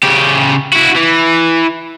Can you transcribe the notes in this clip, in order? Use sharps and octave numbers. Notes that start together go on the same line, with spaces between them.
C#3 G4
E4 F#4
E3